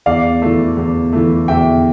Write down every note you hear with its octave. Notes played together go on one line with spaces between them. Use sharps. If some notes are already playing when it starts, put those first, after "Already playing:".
E2 D5 F5
E3 A3
E2
E3 A3
E2 E5 G5